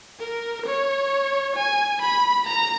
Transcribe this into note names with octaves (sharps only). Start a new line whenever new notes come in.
A#4
C#5
G#5
B5
A#5